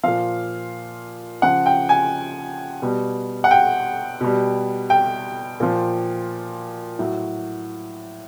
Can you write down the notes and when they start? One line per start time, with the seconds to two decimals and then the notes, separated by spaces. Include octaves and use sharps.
0.03 A#2 F3 F5
1.42 C#3 F3 F#5
1.66 G5
1.89 G#5
2.82 B2 G3
3.44 F#5
3.51 G5
4.21 B2 G3
4.90 G5
5.60 A#2 F3
6.99 A2 F#3